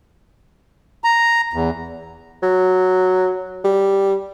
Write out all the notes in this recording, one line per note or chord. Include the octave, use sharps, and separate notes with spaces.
A#5
E2
F#3
G3